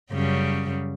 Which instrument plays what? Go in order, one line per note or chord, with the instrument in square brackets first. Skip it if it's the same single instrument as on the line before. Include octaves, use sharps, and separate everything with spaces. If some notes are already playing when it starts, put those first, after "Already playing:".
[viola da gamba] F#2 C#3 G3